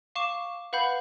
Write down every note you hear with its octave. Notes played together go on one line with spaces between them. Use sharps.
F5 C#6 D6 E7
B4 F5 F#5 B5 G6